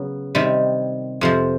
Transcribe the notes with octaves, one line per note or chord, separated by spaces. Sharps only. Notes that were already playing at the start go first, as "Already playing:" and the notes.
Already playing: C#3 F#3 B3
C3 D#3 G3
F2 C3 F3